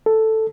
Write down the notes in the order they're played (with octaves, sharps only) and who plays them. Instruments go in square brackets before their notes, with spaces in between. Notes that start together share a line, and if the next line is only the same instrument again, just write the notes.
[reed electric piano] A4